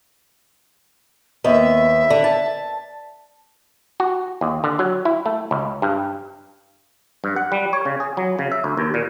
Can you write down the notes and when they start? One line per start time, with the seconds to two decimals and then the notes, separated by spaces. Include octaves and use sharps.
1.44 D#2 B3 E5
2.10 D3
2.24 A5
4.00 F#4
4.41 D#2
4.64 D3
4.79 F#3
5.05 E4
5.26 A3
5.51 C#2
5.82 G2
7.24 G2
7.36 F#5
7.52 G3
7.73 C#5
7.85 C#3
8.00 G#4
8.17 F#3
8.39 C#3
8.52 E5
8.64 D2
8.77 D#2
8.94 A#2